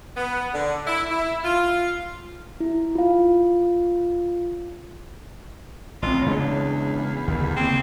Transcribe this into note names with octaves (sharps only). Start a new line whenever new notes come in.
B3
D3
E4
E4
F4
E4
F4 F5
A1 C4 F4
E2 C#3 G#3 D4
D#2 D3
C#3 A#3 C4